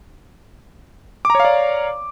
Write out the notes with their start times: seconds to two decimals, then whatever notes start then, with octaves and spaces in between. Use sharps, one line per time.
1.25 D6
1.30 A#5
1.35 C#5
1.40 F5
1.45 D5